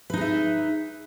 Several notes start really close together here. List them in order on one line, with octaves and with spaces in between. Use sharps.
B4 D#4 G#4 E5